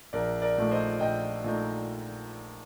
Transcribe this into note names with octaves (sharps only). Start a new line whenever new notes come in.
A#1 A#4 D5
A#4 D5
A#2 A3 D#4
C5 D#5
A#1 D#5 G5
A#2 A3 D#4